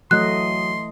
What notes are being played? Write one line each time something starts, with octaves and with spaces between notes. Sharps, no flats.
E3 F#3 A3 D#5 C6 F#6